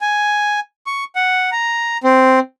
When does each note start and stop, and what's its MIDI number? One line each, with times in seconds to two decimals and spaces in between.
0.01 0.60 80
0.86 1.04 85
1.15 1.50 78
1.52 1.97 82
2.04 2.39 60